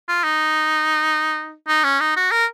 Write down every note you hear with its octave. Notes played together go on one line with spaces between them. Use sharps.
F4
D#4
D#4
C#4
D#4
F#4
A#4